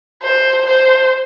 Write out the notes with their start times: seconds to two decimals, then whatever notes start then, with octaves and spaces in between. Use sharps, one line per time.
0.23 C5
0.66 C5